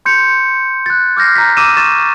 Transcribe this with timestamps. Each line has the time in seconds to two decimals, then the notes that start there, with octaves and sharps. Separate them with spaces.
0.05 C6 G6 C#7
0.86 F#6 A6
1.17 D6 F6 G6 A#6 C7
1.35 A#5 G6 B6
1.57 D6 E6 D#7 E7
1.77 C#6 A6 E7